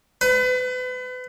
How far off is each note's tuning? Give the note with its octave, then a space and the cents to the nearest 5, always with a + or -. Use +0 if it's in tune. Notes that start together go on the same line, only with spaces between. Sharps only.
B4 +35